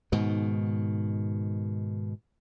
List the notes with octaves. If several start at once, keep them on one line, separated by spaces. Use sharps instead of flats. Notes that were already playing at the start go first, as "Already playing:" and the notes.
G#2 B2 D#3